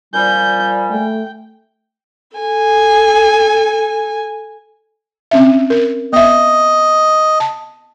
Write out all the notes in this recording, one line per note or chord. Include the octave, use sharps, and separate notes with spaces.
A#2 F3 G3 G#5 G6
A3 G5
A4 G#5
C4 C#4 E5
A#4
B3 D#5 E5
A5